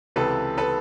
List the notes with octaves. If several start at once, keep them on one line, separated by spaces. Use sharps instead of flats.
C#2 C3 E3 A4 B4
A4 B4